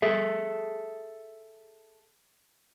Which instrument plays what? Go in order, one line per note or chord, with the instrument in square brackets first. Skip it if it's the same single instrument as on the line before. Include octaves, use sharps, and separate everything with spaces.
[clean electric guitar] G#4 A4 E5